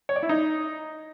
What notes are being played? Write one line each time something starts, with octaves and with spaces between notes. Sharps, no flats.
C#5
D5
E4
D#4